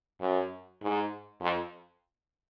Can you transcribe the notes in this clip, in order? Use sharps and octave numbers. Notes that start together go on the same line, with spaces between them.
F#2
G#2
F2